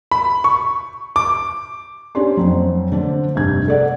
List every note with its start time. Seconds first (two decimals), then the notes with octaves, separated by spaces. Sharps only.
0.11 B5
0.44 C#6
1.16 D6
2.15 C#4 D4 G4 D5 C6
2.37 F2 F#3
2.92 D3 D4 C5
3.35 F1 G2 G#6
3.68 A4 D5 F#5